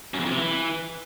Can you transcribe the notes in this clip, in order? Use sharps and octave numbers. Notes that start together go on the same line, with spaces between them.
F#2
E2
F2
C3
E3